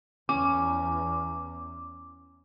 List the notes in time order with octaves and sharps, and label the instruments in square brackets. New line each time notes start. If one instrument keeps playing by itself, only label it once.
[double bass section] E2 [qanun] C#4 [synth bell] D6